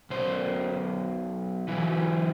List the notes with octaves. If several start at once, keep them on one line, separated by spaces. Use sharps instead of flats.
B1 C5
E3 F#3